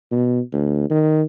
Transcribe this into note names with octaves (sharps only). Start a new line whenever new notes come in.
B2
D2
D#3